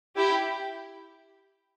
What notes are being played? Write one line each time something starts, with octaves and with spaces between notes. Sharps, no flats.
E4 G4